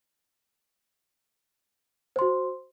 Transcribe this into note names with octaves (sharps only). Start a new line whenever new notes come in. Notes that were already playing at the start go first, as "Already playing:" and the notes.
F#4 C5 C6